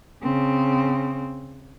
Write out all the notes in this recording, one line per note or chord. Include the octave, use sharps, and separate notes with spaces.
C#3 C4